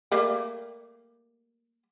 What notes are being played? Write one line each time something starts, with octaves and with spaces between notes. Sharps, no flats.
G3 A3 A#3